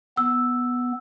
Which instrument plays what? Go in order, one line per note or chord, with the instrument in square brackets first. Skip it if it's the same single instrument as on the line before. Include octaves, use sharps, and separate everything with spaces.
[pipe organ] B3 [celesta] E6